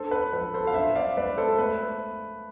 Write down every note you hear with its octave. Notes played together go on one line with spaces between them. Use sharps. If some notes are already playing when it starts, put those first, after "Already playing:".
Already playing: G#3 D4 A4 C5
B4
F3 B4
A4 C5
F5
D4 C5 E5
D5 F5
G#3 B4 D5
A4 C5
A3 B4